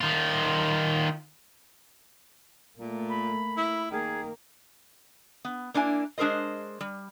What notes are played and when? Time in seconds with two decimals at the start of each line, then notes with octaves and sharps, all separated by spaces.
0.01 D#3 F4
2.79 A#2 A3 A#3
3.09 B5
3.57 E4
3.91 D#3 A#3 G#4
5.45 B3
5.74 A#3 D4 E4 G#5
6.18 G#3 D4 G#4 A#4 C5 D#5
6.81 G3